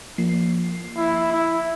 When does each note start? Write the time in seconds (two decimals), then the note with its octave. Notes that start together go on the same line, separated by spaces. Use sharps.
0.18 F3 A#3 C7
0.97 E4
1.32 E4